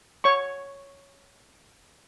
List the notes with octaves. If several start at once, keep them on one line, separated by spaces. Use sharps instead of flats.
C#5 C#6